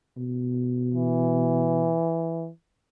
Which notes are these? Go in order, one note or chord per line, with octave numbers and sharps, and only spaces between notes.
B2
E3